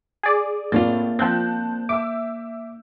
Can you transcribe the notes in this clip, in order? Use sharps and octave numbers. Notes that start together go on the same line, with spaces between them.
G#4 D5
A2 A#3 C4 D4 F4 A6
F3 C4 A5 F#6 G6
E5 D6 E6